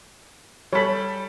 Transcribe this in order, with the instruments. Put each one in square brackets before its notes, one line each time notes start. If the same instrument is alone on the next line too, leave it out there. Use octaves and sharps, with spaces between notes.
[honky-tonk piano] G3 A4 [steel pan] C#5 B5